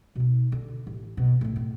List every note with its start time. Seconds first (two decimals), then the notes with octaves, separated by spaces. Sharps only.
0.16 B2 D#4
0.52 D3
0.87 A1
1.17 B2
1.41 A2 E3
1.56 A2